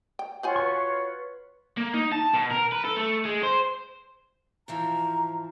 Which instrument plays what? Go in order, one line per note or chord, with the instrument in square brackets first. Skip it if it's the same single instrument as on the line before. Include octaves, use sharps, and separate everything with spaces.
[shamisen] G5
[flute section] F4 F#4 C#5 [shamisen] C5 F#5 G#5
[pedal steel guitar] B4 C#6
[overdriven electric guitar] A#3
D#4
A5
B2
A#4
B4
A4
A3
G#3
C5
[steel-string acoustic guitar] G#2 E3 F3 [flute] A#5